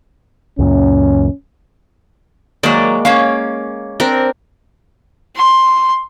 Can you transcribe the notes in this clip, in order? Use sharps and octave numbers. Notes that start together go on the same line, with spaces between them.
C#2 F#2 A#2 C#4
D#3 F#3 G#3 A#3 D5
A#3 C#4 C#5 F5
C4 D4 A#4
C6